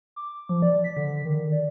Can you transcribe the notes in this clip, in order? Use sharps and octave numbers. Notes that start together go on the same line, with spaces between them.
D6
F3
D5
B6
D3
D#3
D5